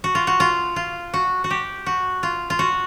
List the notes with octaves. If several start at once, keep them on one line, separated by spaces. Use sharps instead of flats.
F#4
F4
F#4
F4
F4
F#4
F#4
G4
F#4
F4
F4
F#4